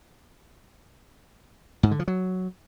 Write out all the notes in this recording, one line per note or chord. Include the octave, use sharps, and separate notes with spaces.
G#2
D3
F3
F#3